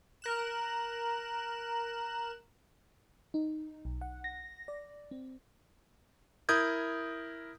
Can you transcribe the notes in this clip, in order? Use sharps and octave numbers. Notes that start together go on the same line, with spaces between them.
A#4 F#6 E7
D#4
B1
F#5
A#6
D5
C4
E4 A#4 D#6 G6 G#6